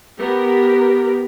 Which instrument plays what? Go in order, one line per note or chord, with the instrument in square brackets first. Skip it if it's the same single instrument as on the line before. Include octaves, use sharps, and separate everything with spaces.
[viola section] B3 G4 A#4